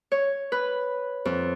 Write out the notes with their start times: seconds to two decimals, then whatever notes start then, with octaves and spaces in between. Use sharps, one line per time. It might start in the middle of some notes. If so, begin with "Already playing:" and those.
0.12 C#5
0.52 B4
1.25 F2